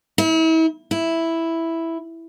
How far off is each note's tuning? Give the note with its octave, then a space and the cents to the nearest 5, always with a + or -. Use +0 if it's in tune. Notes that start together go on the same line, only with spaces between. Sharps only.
E4 -40
E4 +0